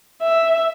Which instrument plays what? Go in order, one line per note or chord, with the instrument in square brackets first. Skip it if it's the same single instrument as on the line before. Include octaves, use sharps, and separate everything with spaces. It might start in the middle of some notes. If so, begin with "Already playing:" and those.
[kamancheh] E5